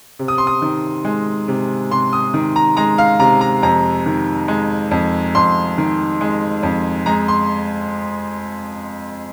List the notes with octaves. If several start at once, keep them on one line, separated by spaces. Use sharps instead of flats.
C3
D#6
C6
D#6
D#3
G#3
C3
C3 C6
D#6
D#3
A#5
G#3 A#5
F5
C3 A#5
A#5
F2 A#5
D#3
G#3
F2
F2 C6
D#3
G#3
F2
G#3 A#5
C6